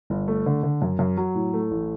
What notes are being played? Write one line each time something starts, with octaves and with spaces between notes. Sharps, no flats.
G1
A3
D3
D3
F#2
F#2
F#3
A2
A3
A1